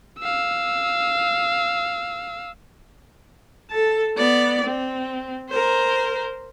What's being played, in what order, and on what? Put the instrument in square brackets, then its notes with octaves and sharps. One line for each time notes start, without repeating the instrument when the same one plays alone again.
[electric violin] F5 E6
[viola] A4 A5
B3 D5
C4
A#4 C5